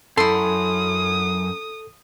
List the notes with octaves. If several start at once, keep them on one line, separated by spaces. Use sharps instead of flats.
F#2 E4 A4 C6 D#6